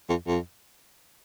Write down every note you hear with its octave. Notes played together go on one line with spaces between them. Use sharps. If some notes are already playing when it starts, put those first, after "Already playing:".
F2
F2